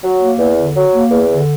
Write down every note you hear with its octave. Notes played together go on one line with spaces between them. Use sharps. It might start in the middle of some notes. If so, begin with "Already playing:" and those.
F#3
A#3
E2
D3
F#3
A#3
E2
D3